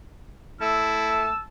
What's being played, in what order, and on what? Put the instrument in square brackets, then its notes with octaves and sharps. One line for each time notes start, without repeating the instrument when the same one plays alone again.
[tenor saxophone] A3 [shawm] E4 [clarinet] A5 [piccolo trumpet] E6